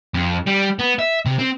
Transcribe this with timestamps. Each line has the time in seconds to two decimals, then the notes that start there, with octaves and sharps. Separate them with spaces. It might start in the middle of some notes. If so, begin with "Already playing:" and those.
0.14 F2
0.47 G3
0.79 B3
0.99 E5
1.26 C3
1.39 C4